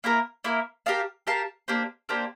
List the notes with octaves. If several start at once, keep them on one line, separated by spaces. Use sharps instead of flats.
A#3 E4 A#4
A#3 E4 A#4
G4 A#4 F5 A5
G4 A#4 F5 A5
A#3 D4 G4 C5
A#3 D4 G4 C5